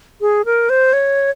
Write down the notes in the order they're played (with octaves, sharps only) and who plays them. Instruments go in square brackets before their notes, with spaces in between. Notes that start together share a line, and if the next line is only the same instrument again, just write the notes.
[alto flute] G#4
A#4
C5
C#5